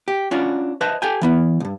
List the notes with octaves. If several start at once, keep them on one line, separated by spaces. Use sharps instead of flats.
G4
C#4 D4 F4 F#4
B4 C5 D#5 E5 A5
G4 A4 G5 G#5
E3 B3 E4
C2 G2